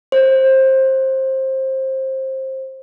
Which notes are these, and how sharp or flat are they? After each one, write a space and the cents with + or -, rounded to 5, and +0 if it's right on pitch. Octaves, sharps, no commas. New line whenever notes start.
C5 +20